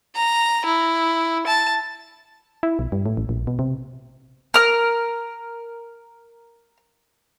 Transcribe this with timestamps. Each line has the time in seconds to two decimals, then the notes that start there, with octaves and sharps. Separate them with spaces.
0.16 A#5
0.65 E4
1.47 A5
2.63 E4
2.79 B1
2.92 G2
3.06 A2
3.17 A1
3.29 A#1
3.47 B2
3.59 C3
4.54 A#4 F6